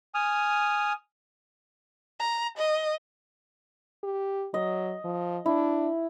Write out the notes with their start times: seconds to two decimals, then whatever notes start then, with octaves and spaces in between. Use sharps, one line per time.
0.15 G#5 D#6 F6
2.19 A#5
2.57 D#5
4.04 G4
4.54 F#3 D#5
5.05 F3
5.46 D4 E4